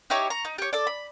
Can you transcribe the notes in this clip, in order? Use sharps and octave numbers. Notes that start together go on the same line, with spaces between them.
D#4 E4 G4 C#5
A#5 C#6
D#4
G4 C#5
A4 D5
B5